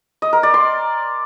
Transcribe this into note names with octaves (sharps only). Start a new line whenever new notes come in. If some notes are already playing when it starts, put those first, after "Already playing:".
D#5
A#4
D5
C6